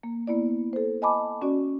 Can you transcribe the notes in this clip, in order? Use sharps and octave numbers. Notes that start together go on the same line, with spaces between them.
A#3
A#3 B3 E4 D5
A4 C5
D#5 G#5 A5 B5 D6
C#4 F#4 D5